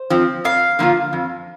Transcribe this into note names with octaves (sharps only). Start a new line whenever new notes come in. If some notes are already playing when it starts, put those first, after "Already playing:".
Already playing: C5
F3 C4
F2 F5
D3 F3 A#3 F4
F2